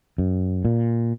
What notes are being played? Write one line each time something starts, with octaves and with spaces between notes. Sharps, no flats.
F#2
A#2